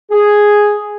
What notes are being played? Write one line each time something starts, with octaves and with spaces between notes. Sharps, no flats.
G#4